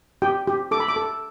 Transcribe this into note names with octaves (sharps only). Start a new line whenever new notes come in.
G4 G5
G4
A4 D6
B5
D6
A4